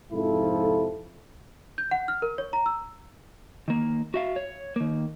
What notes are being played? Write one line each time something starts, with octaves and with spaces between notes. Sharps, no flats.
F2 G#2 C3 F3 E4 A4
G6
F#5
F6
A#4
C#5
A#5
E6
D#3 A#3
F#4 E5 F5
C#5
D#3 A#3